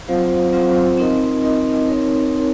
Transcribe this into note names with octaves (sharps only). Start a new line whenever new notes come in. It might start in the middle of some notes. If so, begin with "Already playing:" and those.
F#3 C4 F4 C5 F5
F#3 C4 F4 C5 F5
C4 D#4 A#4 D#5
C4 D#4 A#4 D#5
C4 D#4 A#4 C#5
C4 D#4 A#4 C#5